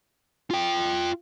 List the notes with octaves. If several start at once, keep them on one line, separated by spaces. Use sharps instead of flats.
F4 G5